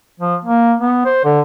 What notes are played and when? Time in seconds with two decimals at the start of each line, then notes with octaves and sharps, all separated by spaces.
0.20 F3
0.45 A#3
0.81 B3
1.06 C5
1.24 D3